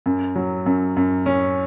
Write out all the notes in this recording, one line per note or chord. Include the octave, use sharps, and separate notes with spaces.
F#2
F#3
F#2
F#2
C#4